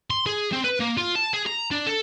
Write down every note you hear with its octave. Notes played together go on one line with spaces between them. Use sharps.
C6
G#4
C4
B4
A#3
F4
A5
G#4
A#5
D4
A4